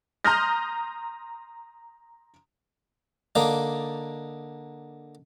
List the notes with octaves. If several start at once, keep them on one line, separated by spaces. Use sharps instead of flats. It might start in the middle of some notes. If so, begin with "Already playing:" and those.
A#5 C6 D#6 F6 G6 A#6
D3 A#3 D4 D#4